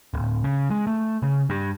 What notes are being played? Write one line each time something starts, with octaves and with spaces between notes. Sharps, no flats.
D1
C#3
G#3
A3
C#3
G2